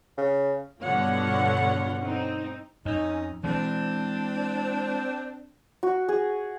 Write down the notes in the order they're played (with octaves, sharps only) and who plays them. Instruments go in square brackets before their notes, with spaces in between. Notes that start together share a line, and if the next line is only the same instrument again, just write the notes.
[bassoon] C#3
[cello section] G2 B2 D3 [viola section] F4 C#5 F#5
[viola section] C4 D#4
[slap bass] F2 [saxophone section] C#4 D#4
[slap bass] E3 G#3 [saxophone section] C4 D4
[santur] F#4
G#4